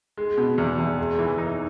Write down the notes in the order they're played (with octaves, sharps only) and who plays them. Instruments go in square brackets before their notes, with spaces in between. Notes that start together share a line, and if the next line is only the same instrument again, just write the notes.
[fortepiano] G#3
B2
E2
E2
G#3
E3
D#4